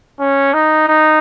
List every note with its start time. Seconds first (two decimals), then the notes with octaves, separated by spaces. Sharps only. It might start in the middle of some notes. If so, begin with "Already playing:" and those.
0.20 C#4
0.54 D#4
0.88 D#4